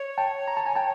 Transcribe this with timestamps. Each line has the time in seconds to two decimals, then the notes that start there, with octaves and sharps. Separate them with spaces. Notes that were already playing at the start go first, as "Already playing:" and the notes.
Already playing: C#5
0.18 G5 A5
0.48 A#5
0.57 A5
0.66 G#5 A#5
0.75 G5 A5